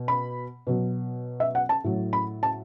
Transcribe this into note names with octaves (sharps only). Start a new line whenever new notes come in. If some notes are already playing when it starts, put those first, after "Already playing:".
Already playing: B2
B5
B2 F#3
E5
F#5
A5
A2 F#3
B5
A5